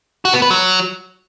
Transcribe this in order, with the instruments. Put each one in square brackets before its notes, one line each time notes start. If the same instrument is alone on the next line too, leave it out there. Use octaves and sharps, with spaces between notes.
[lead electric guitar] F#4
B3
B4
F#3